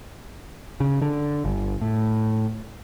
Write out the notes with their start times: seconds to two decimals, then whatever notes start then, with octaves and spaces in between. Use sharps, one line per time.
0.80 C#3
1.01 D3
1.44 G1
1.81 A2